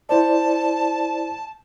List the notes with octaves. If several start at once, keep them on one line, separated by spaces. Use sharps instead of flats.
E4 C5 D5 A5